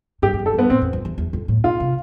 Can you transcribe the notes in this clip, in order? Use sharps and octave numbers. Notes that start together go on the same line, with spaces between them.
G2 G4
G2
F2
A4
A2
G2 B3
A2 C4
F2
F2
E2
E2
F2
A2
B2 F4
C3